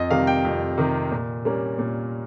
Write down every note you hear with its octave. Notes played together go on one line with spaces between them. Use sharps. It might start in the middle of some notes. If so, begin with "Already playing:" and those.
Already playing: F2 D#5
C3 D#3 G3 F5
G5
F2
C3 D#3 G3
A#2
G3 A#3 C#4
A#2